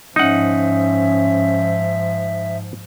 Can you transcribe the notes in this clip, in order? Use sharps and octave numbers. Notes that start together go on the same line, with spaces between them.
G#2 F3 C#4 D#4 E5 F#5